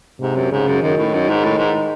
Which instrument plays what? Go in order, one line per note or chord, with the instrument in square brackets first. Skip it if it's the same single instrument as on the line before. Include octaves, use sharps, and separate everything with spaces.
[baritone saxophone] G#2 [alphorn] C3
[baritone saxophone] F#2
[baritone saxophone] G#2 [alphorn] C#3
[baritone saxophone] F#2
[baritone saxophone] F#2 [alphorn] D#3
[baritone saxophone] A2
F#2
G#2
A2
G#2